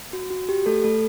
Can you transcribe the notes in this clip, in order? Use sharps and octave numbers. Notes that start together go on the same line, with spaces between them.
F#4
F#4
G4
A3 A4
A3 A4